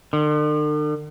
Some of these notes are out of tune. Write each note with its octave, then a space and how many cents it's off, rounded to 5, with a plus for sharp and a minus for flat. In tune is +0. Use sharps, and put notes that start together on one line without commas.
D3 +45